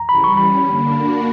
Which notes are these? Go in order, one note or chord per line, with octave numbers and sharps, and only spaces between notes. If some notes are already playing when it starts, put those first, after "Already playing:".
Already playing: A#5
C#3 E3 G3 B5
C#6
E3 G3 C#4 B5
D3 A#3 D4
A#3 D4 F#4 A#4